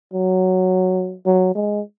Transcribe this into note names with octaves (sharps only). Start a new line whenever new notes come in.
F#3
F#3
G#3